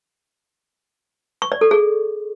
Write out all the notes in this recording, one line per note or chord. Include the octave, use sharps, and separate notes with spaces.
C#6
D5
A4
G#4